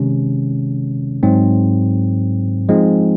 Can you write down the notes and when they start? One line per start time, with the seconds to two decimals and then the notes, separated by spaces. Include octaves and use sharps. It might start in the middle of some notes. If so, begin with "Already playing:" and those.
Already playing: C3 D#3 G#3 C#4
1.23 G#2 F#3 C4
2.69 F3 G#3 C4 D#4